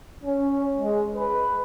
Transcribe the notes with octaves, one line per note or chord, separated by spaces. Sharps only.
C#4
G#3
B4